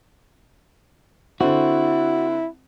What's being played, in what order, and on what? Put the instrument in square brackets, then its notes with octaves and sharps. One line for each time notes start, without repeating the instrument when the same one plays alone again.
[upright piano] D3 C4 [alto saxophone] E4 [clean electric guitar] F#4